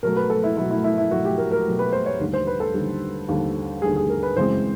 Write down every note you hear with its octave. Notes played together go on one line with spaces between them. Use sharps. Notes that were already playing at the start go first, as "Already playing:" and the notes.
B2 F#3 A3 A#4
B4
A4
E4
B2 F#3 A3 E4
E4
E4
E4
B2 F#3 A3 F#4
G4
A#4
A#4
B2 F#3 A3
B4
C5
C#5
D#2 D3 G3
C5
B4
A4
D#2 D3 G3
D#2 D3 G3
D#2 D3 G3 G#4
G#4
A#4
B4
F#2 C#3 E3 G#3 C4 C5